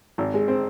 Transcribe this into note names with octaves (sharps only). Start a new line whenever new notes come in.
G#1
G#3
C4